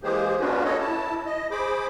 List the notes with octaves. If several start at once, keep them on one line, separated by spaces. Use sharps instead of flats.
E3 G#3 A#3 G4 G#4 C5
A#3 C#4 D4 F4 F#4 B4
A4 C#5 D#5
E4 A5
D#5
G#4 C5 B5 D6